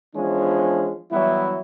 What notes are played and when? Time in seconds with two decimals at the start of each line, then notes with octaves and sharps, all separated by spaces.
0.15 E3 F3 G#3 B3 C#4 D4
1.11 E3 F#3 G3 B3 E4